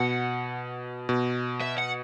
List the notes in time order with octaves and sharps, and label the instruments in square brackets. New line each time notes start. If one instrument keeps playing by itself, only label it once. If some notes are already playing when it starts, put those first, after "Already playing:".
Already playing: [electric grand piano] B2 [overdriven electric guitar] F#5
[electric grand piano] B2
[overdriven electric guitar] E5
F#5